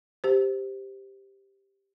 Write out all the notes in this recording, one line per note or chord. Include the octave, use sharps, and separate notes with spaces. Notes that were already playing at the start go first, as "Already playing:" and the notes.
G4 C5